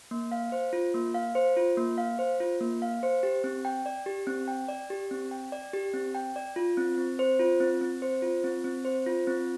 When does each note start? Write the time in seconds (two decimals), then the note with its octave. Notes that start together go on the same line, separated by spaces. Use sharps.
0.11 A#3
0.32 F5
0.52 C5
0.73 F4
0.94 A#3
1.14 F5
1.35 C5
1.57 F4
1.77 A#3
1.98 F5
2.19 C5
2.40 F4
2.61 A#3
2.82 F5
3.03 C5
3.23 G4
3.44 C4
3.65 G5
3.86 D5
4.06 G4
4.27 C4
4.48 G5
4.69 D5
4.90 G4
5.11 C4
5.31 G5
5.52 D5
5.73 G4
5.93 C4
6.15 G5
6.36 D5
6.56 F4
6.77 C4
6.98 C4
7.19 C5
7.39 F4
7.60 C4
7.81 C4
8.02 C5
8.22 F4
8.44 C4
8.64 C4
8.85 C5
9.06 F4
9.27 C4